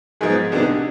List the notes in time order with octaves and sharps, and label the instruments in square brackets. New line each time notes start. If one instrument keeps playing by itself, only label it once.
[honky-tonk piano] G#2 F3 B3 [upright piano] G#4
[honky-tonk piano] C2 C3 D#3 B3 D4